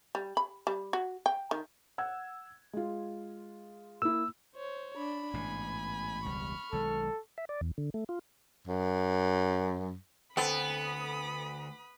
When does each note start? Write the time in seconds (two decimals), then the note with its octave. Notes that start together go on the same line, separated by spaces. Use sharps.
0.15 G3
0.37 B5
0.67 G3
0.93 F#4
1.26 G5
1.51 D#3
1.98 F#5 E6 G#6
2.73 G#3 F4
4.02 A#3 E4 E6
4.55 C5 C#5
4.97 D4 B5
5.34 A1 G#2 B2 G#5
6.25 E1 C#2 G3 C#6 F6
6.72 B1 D#3 G#3 A4
7.38 E5
7.49 D5
7.61 E2
7.78 D3
7.94 A3
8.09 F4
8.67 F#2
10.37 D2 B3 C4 A4 B5 D#6